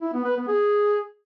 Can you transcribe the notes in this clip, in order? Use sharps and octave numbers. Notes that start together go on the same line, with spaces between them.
E4
B3
B4
B3
G#4